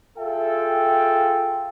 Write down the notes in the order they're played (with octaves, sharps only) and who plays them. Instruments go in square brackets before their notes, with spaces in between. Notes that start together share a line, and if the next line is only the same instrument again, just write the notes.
[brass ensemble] F4 G#4 A4 E5 F5 G5